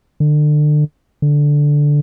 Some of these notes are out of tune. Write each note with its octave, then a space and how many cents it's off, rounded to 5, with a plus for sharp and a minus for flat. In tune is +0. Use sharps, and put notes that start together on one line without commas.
D3 +30
D3 -5